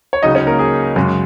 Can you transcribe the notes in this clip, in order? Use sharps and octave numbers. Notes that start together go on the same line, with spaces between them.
C#5
C#2 C#3 F#3 D#4 D#5
C#4 C#5
A#3 A#4
G#4
F#2 C#3 G#3